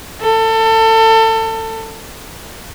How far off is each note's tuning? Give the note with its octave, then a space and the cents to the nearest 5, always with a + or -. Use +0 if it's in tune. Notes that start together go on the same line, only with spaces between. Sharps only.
A4 +25